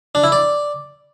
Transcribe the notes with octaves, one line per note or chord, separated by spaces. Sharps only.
D4
E4
D5